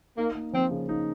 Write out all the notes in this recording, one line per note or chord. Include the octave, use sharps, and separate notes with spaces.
A#3 D#4
A#3
F3 C4
C#3
D#4